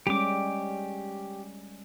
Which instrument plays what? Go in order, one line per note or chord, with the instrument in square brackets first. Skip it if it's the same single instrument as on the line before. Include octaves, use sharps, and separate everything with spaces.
[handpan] G3 G#3 C#4 [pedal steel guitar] G4 D6